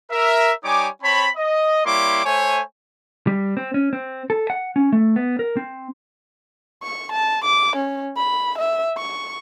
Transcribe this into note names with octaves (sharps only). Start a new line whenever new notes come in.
A#4 E5
G3 D#4 C#5 G#5 D6
C4 C#5 A5 B5
D#5
G3 A#3 E4 C#5 C6 D6
A3 C5 C#5 E5 G#5
G3
C4
C#4
C4
A4
F#5
C#4
A3
B3
A#4
C4
C#6
A5
D6
C#4
B5
E5
C#6